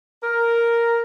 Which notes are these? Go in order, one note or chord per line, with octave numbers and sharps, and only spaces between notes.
A#4